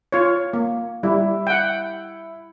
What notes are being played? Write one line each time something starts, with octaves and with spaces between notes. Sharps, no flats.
F4 C#5
A#3
G3 E4
F#5 G5